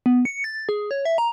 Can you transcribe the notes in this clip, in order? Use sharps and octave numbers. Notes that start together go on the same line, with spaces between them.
B3
C#7
A6
G#4
C#5
E5
A#5